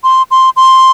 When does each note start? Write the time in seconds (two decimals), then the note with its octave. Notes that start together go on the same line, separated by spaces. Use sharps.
0.04 C6
0.31 C6
0.56 C6